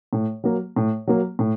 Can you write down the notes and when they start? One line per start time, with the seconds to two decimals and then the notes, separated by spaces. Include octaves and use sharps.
0.13 A2
0.44 F#3 A#3
0.76 A2
1.07 F#3 A#3
1.39 A2